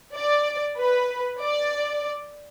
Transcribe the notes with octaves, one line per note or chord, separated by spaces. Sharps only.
D5
B4
D5